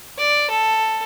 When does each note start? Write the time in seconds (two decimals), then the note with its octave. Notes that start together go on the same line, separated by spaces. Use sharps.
0.18 D5
0.51 A4